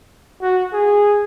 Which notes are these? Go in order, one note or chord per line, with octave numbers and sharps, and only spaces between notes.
F#4
G#4